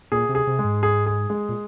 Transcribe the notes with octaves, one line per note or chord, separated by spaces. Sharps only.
A#2 G#4
C3
G#4
C3
G#3
G#2
G#4
G#4
G#3
A#2